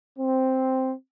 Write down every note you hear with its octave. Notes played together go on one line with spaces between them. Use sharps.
C4